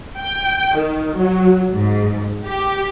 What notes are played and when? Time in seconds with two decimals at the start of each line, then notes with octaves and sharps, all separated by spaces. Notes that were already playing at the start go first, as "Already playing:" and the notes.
0.19 G5
0.76 D#3
1.16 F#3
1.72 G#2
2.44 G4